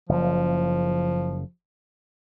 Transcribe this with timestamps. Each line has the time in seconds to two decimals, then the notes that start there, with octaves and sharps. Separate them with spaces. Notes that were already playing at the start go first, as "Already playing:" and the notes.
0.09 F#1 F3